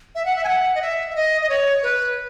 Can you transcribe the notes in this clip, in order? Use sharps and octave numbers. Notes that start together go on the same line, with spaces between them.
E5
F#5
E5
G#5
F#5
D#5
E5
E5
D#5
D#5
C#5
B4